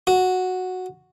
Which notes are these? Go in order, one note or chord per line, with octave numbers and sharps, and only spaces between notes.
F#4